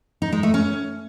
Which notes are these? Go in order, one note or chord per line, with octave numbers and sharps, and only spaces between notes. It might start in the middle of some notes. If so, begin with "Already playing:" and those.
D#4
G#3
A3
C#4